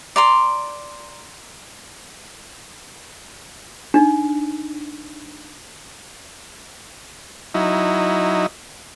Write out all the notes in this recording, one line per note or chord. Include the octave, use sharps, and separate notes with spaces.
D5 A#5 C6
D4 D#4
F#3 D#4 E4